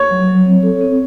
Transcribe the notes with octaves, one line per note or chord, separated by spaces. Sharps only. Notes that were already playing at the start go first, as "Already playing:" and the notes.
Already playing: C#5
F#3
F#3
C4
A4
C4